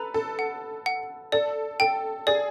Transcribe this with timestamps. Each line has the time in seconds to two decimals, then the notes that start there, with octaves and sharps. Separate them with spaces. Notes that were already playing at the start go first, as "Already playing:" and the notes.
Already playing: A4 B4 A#5
0.14 A4
0.39 F#5
0.86 F#5
1.32 A4 D5
1.80 A4 G5
2.27 G#4 D5